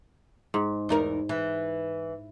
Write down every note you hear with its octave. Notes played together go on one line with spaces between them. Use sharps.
G#2
E2 D#4 A#4
E3